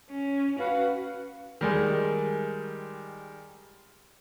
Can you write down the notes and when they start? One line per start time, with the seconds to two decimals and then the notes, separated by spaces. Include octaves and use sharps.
0.11 C#4
0.60 F#4 B4 F5
1.61 D#3 G3 G#3